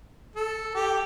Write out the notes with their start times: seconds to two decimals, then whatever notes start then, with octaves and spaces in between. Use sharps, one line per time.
0.36 A4
0.75 G4